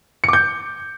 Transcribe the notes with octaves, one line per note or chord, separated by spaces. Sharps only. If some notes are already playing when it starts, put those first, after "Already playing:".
D6 G6 C#7